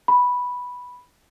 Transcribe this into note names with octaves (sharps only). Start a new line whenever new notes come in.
B5